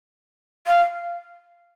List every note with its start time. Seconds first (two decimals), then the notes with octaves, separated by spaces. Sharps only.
0.67 F5